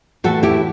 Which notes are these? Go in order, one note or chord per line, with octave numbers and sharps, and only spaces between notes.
A2 E3 F#4 A4
E4 G4